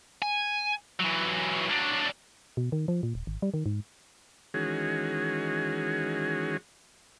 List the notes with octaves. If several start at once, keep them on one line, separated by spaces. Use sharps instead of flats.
G#5
E3 F#3
F#3 D4
B2
D#3
F3
A#2
D#1
G#1
G3
D#3
G#2
D#3 E3 G#3 C#4 F#4 G#4